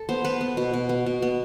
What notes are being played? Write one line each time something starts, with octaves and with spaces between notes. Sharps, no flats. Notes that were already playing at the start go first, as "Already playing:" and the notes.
Already playing: A4
B3 C5
B3 B4
B3
B2
B2
B3
B2
B3